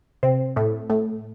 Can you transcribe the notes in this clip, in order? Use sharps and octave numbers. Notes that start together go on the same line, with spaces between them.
C3 C4
A2 A3
A2 A3